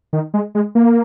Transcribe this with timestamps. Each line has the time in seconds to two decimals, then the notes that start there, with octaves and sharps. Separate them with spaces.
0.13 D#3
0.34 G#3
0.55 G#3
0.75 A#3